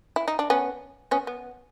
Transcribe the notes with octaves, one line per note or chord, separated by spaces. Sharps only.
E4
D#4
D4
B3 C#4
B3 C#4
B3